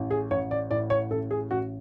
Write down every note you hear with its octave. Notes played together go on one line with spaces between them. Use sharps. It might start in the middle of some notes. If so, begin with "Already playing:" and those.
Already playing: A1 A2
G#4
A1 C#5
D5
A2 D5
C#5
A1 A4
G#4
A1 F#4